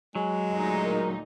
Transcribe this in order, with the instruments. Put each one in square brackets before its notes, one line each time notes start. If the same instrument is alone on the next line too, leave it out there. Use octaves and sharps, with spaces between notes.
[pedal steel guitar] F#3 [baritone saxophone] G#3 [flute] G#5
[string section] D2 A#2 D#4
[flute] A#4